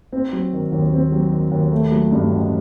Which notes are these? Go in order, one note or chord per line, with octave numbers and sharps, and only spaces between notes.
C4
F#3
D#3
D#2
C4
F#3
D#3
D#2
A3
F#3
G2
A1